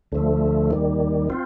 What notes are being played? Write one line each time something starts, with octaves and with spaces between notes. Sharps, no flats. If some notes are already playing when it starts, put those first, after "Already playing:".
D2 D3 F3 A3
D#2 D#3 G3
C4 F4